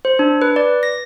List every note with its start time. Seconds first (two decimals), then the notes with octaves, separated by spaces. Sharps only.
0.05 C5
0.19 D4
0.42 B4
0.56 D5
0.83 A#6